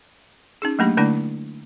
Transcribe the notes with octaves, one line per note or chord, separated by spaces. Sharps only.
C#4 D#4 G#4
F#3 A3 A#3 D4 G4
D3 A3 A#3 D4 E4 D5